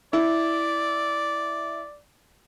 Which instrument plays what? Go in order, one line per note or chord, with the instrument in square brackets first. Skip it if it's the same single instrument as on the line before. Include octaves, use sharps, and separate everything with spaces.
[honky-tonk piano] E4 [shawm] D5